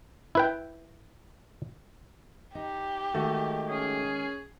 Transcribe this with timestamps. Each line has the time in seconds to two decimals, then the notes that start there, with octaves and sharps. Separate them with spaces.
0.35 E4 B4 G5
2.55 D#4 G4
3.14 D#3 G#3 A3 D#4 F#4
3.69 C#4 G#4